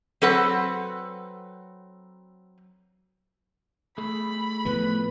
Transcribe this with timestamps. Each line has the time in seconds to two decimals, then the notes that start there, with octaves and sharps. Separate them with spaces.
0.22 F#3 C4 A4 B4 F#5
3.98 A3 G#4 A4 B5
4.65 A2 F3 B3 B4